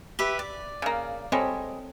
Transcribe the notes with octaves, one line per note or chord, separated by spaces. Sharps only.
G4 B4 E5
D5
C#3 A#3
G3 G#3 C4 A4 C#5